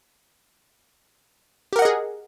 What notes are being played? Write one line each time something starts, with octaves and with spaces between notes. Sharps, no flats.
G4 G#4 A#4 D#5 F#5